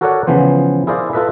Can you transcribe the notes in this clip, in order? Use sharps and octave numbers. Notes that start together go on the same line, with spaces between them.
F#4 A4 A#4 C#5 D5 F#5
C#3 E3 F3 B3 C5
E4 G#4 A#4 C5 D5 F5
E4 F4 A4 B4 D#5 E5